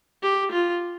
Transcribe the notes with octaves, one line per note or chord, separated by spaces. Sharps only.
G4
F4